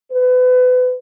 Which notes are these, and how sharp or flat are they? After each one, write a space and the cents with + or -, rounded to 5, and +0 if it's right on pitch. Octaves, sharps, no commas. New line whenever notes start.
B4 +30